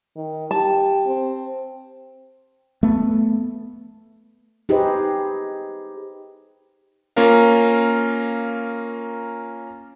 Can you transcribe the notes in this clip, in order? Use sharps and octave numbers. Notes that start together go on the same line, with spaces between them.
D#3
G4 A5
C4
A3 B3
D#4 G4 G#4 B4 C5 D#5
A#3 C#4 F4 A#4 F5